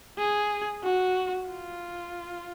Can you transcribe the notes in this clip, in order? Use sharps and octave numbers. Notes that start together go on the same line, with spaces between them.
G#4
F#4
F4